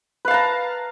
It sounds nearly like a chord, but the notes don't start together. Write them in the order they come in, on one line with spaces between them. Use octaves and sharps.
B4 F5 A5 A#5